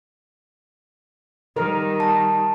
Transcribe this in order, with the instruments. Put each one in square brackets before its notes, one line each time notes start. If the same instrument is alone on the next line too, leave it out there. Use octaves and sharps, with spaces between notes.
[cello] D#3 G3 [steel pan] A#4
[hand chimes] A5